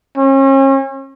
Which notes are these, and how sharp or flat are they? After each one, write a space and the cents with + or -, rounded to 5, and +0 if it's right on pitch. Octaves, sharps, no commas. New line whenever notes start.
C#4 -40